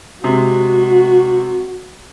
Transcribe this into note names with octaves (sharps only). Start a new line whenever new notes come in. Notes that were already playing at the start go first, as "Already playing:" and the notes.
C3 G#3 F#4